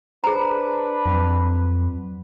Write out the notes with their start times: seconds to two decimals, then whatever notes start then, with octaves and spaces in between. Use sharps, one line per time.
0.24 D4 G#4 B4 C5 A#5
1.06 F2 F#3 C4